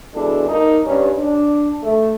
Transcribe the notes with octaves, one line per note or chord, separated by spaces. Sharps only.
B2 E3 G#3 D4 A4
A#3 D#4
G2 C#4
D4
A3